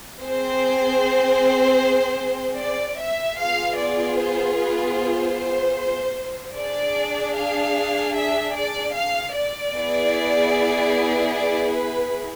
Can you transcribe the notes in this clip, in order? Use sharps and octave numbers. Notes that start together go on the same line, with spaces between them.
C4 G#4 C5
D5
E5
B3 F4 G#4 F5
D5
C5
B4
C5
D4 G#4 D5
F5
E5
D5
F5
D5
B3 E4 G#4
D5
B4